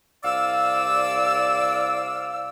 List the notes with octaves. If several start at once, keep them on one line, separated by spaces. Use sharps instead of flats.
C2 D5 F5 D6 E6